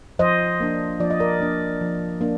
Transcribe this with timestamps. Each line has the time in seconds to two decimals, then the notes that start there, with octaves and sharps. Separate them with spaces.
0.19 F3 C5 D#5
0.60 A#3 D4
1.00 F3 D5
1.10 D#5
1.20 A#4 D5
1.40 A#3 D4
1.81 F3
2.21 A#3 D4